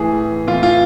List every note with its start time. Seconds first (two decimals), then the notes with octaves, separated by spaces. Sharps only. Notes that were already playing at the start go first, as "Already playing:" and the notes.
Already playing: A2 E3 G#4
0.47 A2 E3 F4
0.63 F4